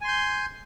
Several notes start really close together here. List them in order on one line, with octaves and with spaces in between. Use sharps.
G#5 C6 G6